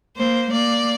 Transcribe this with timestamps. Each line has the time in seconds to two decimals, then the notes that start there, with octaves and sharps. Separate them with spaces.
0.17 A#3 C5
0.51 A#3 D5